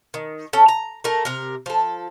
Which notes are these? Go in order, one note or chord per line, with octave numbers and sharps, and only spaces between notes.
D#3
C#4 A4
A#5
A3 A#4 A#5
C3 A#4
F3 A4